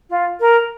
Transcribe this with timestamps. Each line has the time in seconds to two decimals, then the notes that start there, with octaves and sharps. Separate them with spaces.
0.09 F4
0.40 A#4